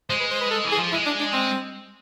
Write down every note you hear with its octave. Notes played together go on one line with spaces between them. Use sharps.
G#3 C5
B4
C5
B4
A4
E3
G#4
F3
G#3 E4
D4
D4
C4